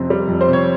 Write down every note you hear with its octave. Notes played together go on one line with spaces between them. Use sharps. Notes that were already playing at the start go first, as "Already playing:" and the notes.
Already playing: F2 C3 C4
G3
F2
C5
C3
C#5